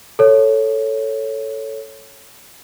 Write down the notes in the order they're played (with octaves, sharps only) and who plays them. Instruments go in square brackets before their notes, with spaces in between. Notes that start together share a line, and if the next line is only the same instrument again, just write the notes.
[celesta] A4 C#5